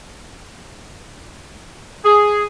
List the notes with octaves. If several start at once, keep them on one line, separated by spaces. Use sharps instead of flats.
G#4